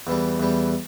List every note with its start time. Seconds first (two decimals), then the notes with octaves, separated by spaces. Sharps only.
0.07 E2 E3 G3
0.40 E2 E3 G3